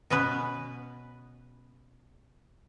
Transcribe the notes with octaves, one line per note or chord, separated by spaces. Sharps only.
B2 B3 C#4 B4